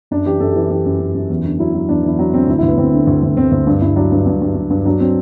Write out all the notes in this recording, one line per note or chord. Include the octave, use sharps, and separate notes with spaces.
F#2 D4
E3 G4
F#2 A4
G4
E3
E3 G4
F#2
F#2
F#2
E2
D3
F#3 E4
F#3
E2 D4
E2 E4
F#3 D4
D3 C4
D2 E4
E4
D2 B3
D2 C4
D3
D2
D2
D2 C4
D2 C4
G2
G2 E4
F#3 D4
G2
G2
G2
G2
G2
F#3 D4
F#3 C4